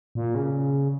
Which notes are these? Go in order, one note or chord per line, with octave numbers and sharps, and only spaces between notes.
A#2
C#3